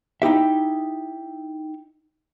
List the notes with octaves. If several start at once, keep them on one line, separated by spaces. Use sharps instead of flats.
D#4 E4 G4 E5